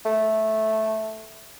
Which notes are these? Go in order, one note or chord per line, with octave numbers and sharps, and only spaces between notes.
A3